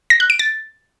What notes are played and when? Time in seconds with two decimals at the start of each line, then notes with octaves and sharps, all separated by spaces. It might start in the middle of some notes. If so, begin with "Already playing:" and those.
0.10 A#6
0.20 F#6
0.30 D7
0.39 A6